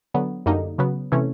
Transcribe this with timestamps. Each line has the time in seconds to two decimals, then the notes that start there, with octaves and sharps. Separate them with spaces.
0.14 D3 F#3 B3
0.46 F#2 D3 G3 A#3 D#4
0.78 C#3 F#3 B3
1.12 C3 E3 A3 C#4